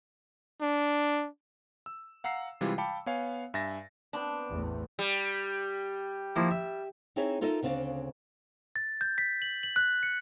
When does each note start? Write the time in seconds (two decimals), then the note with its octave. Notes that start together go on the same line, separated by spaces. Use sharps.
0.61 D4
1.86 E6
2.24 F5 F#5 A#5 E6 C7
2.61 C3 E3 G3 G#3 E4 F4
2.78 F5 G5 A5 B5 D6 C#7
3.06 B3 C#5 F5 G#5
3.54 G2 E5 G#5 A6 A#6
4.13 B3 C4 D4
4.50 A1 E2 A3
4.99 G3
6.36 F3 A#3 E4
6.51 E5
7.16 C4 D#4 E4 G#4 C#5 E5
7.41 D#4 F4 A4 A#4 D#5 E5
7.62 D2 C#3 C4 D4 F5
8.76 A6
9.01 G6
9.18 B6
9.42 F#7
9.63 F#7
9.76 F#6
10.03 C#7